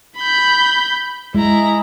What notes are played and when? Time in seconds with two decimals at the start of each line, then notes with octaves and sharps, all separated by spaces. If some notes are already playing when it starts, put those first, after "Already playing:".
0.18 B5 G6
1.35 G#3 E4 A#5